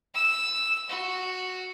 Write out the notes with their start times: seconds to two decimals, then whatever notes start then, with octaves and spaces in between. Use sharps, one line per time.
0.15 E6
0.89 F#4